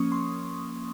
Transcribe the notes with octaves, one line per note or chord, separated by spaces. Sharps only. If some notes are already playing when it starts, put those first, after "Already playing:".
Already playing: F3 A#3 C#4 C#6 D#6
C6